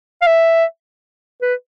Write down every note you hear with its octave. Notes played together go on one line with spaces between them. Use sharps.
F5
E5
B4